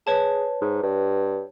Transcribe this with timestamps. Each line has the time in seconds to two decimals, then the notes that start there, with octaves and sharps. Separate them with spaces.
0.07 G#4 B4 C#5 A5
0.62 G#2
0.83 G2